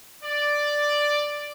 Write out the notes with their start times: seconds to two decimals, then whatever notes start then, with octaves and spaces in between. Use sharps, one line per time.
0.24 D5